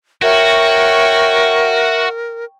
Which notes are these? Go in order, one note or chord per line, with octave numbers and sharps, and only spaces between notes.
F#4 A#4 C#5 E5 G5